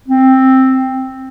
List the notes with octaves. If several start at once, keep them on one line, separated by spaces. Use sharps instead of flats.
C4